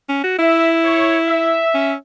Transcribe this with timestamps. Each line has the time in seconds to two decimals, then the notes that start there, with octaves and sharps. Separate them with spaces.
0.09 C#4
0.24 F#4
0.39 E4 E5
0.84 C#5
1.29 E5
1.74 C#4